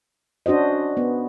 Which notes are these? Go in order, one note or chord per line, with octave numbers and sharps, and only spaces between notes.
C#4 D4 F#4 C5 D#5
B3